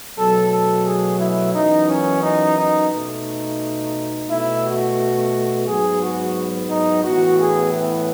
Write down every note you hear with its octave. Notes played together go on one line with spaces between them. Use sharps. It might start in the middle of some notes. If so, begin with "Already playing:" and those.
B2 F#3 A3 A4
A4
G#4
E4
F#2 E3 B3 D#4
C#4
D#4
D#4
B2 A3 D#4
B2 A3 E4
F#4
G#2 F#3 B3 G#4
F#4
D#4
A2 E3 B3 F#4
G#4
E4